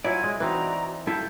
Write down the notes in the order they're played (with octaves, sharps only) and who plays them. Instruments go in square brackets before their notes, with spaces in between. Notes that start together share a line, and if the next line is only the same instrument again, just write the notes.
[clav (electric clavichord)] F#3 E4 [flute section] F4 G#5 G#6 [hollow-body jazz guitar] C#5 D5
[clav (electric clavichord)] G#3
[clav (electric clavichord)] E3 C4 D#4 [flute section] F#4 D5 A#5 [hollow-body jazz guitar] B4
[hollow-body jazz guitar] G3 E4 F4 [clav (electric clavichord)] A4 [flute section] G6